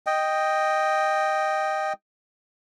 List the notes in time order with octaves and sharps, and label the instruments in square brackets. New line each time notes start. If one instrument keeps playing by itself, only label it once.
[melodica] D#5 G5